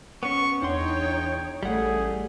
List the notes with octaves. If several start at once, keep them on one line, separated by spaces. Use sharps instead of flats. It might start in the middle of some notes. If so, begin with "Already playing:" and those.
B3 C#4 C#6
E2 D4 D#4 C#5 F#5 G5 C6
A1 G3 A3 G#4 F#5